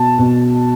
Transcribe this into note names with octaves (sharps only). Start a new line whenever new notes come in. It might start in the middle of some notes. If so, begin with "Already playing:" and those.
Already playing: B2 A5
B2